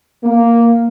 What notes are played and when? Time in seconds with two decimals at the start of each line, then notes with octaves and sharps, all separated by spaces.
0.25 A#3